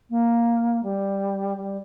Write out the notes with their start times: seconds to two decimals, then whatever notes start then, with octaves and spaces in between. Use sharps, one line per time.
0.10 A#3
0.83 G3
1.57 G3